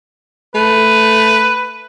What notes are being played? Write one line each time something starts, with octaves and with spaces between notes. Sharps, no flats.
A3 B4